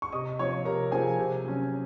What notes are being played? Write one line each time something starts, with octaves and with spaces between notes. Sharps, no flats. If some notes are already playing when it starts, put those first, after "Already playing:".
C#6
C3 D#5 D#6
F3 C4 C#5 C#6
C3 A#4 A#5
F3 C4 G#4 G#5
C3
F#3 C#4